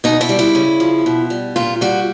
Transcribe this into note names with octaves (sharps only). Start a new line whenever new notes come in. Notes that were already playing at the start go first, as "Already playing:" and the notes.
B2 D#4
E4
G3
E4
C#3
F3
B2
G3
A#2 F4
G3 F#4